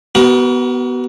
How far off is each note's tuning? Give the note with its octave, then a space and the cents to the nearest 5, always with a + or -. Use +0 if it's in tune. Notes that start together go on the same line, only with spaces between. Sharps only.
B3 +0 F#4 +40 A#4 +25